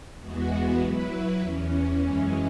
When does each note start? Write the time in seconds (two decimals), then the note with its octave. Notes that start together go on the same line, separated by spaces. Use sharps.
0.20 E2 E3 G#3 B3 F#4
0.80 F#3 E4 B4
1.40 E2 E3 C#4
2.01 F#2 E3 G#3 C#4